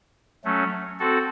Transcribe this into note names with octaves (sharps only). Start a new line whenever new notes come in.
F#3 A3 C#4
C4 F#4 A4